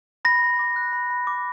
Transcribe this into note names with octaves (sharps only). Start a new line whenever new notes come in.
B5 A#6
B5
D6
F#6
B5
B5
D6